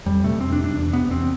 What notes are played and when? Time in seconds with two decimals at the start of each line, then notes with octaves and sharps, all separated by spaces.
0.06 F2 G3
0.24 C3 A3
0.41 F2 C4
0.52 D4
0.58 C3
0.64 D4
0.75 E2
0.93 C3 B3
1.11 E2 C4